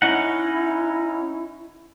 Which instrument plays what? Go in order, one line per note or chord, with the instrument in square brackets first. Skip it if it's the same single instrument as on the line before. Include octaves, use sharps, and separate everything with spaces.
[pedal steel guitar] C#4 D#4 F#5 [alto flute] E4